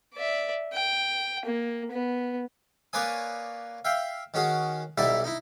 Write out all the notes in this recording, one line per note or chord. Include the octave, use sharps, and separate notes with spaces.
D5 E5
G5
A#3
B3
A#3 B4 C#5 D5 G#5 D#6
E5 F5 G5
D#3 C#4 F#4 G#4
B1 G3 D#4 E4 D5 E5
D#4 E4